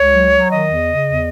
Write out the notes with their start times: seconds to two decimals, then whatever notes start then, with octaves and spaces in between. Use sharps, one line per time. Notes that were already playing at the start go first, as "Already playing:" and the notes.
Already playing: C#2 C#5
0.12 F#3
0.31 F#3
0.50 D#3 D#5
0.68 E2
0.86 C#3
1.05 E2